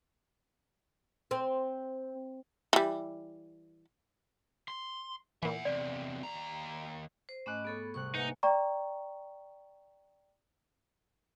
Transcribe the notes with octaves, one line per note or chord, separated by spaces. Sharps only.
C4
E3 G3
C6
A#2 E3 E5 F#5
E2 C3 D5
D#2 A#5
C5
G#2 A3 C#4 D#5 G#5 B5 D6 F#6
B3 G#4 A4 C#5
C2 C3 C#6 F#6
A#3 D#4 B4 E5 F#5 G#5
D5 G5 A#5 C#6